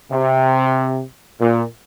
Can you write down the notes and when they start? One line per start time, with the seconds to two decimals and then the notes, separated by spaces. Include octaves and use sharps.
0.11 C3
1.40 A#2